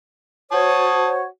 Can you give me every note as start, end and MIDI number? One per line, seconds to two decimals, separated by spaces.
0.52 1.23 66
0.52 1.23 72
0.52 1.23 73
0.52 1.09 81
0.52 1.09 87